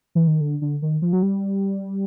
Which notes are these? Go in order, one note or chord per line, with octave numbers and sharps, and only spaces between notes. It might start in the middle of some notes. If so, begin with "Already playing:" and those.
E3
D#3
D3
D3
D#3
F3
F#3
G3